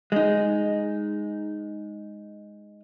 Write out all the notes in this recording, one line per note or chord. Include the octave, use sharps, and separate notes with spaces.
G#3 D#4